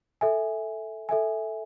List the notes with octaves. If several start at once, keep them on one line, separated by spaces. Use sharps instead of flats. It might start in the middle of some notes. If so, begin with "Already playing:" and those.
A4 E5 G#5
A4 E5 G#5